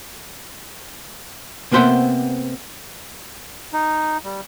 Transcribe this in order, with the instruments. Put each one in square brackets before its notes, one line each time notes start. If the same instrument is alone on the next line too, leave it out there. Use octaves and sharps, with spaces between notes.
[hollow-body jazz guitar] C3 A#3 B3 C5 E5 F#5
[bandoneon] D#4
G3